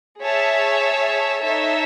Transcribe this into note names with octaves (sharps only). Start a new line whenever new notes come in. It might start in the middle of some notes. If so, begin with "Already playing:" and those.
G#4 C#5 E5 A5
D#4 A4 C#5 E5 A5